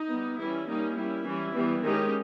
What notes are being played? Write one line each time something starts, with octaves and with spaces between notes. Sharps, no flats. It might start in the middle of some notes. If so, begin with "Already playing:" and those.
Already playing: D#4
G3 B3
E3 G3 C#4 E4
G3 A#3 C#4 D#4
G3 C#4 E4
E3 G3 C#4
E3 G3 B3
D#3 G#3 C#4 D#4 G4